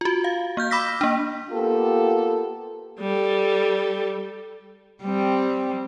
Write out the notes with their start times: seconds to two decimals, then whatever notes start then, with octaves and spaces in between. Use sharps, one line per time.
0.01 F4 F#4
0.24 F5
0.57 A#3 F6 G6
0.71 B5 D6 E6 A#6 B6
1.01 A#3 D4
1.50 A#3 B3 F4 G4 A4
3.00 G3 A4
5.03 G3 C4